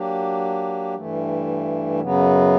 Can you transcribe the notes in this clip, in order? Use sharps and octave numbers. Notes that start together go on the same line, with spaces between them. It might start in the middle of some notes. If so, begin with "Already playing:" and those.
Already playing: F#3 A#3 D4 G4
G2 E3 A3
F#2 C#3 F#3 B3